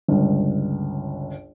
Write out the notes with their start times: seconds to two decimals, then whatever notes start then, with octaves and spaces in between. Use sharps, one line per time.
0.08 G1 C#2